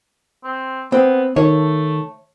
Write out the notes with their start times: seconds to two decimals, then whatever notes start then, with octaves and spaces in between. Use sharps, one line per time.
0.44 C4
0.92 B3 C4
1.36 D#3 A3 C#5